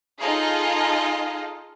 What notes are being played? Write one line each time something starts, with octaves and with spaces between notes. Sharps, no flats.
D#4 F4 G#4 A4 D#5 F5